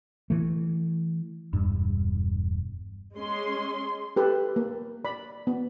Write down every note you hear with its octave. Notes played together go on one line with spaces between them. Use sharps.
E3 A3
E1 G2
G#3 C#4 C6
G4 A4 B4
A#3
D5 B5
B3